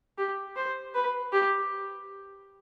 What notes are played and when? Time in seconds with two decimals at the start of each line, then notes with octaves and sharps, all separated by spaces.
0.18 G4
0.56 C5
0.95 B4
1.33 G4